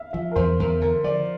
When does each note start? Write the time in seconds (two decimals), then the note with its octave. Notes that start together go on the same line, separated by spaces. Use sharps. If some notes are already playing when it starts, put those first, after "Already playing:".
Already playing: E5 F5
0.13 F3 E5
0.31 A#4
0.36 E2 C5
0.59 E2 A#4
0.81 D3 A#4
1.04 F3 D5